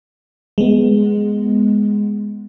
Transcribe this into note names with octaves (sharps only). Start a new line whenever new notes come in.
G#3 B3